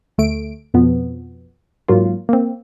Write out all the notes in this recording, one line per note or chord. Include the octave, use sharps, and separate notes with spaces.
D2 A3 D7
F2 B2 F3 B3
G#2 F#3 A#3 F4
A#3 C4